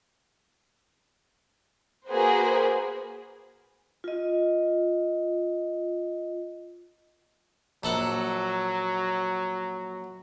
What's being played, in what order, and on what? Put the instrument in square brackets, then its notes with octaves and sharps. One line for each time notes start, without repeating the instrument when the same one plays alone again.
[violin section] A#3 F#4 G#4 B4 C5
[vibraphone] F4 D#5
[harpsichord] A#1 A4 F#5 [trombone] F#3